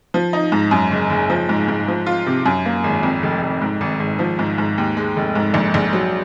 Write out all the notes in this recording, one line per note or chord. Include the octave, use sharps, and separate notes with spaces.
F3
D#4
G#2
F#2
F#1
F#1
F3
G#2
G#2
F3
F4
C3
F#2
A#3
G#1
F2
F1
F1
G#2
G#1
G#1
F3
G#2
G#2
D#2
G#3
F1
G#2
A#1
A#1
F#3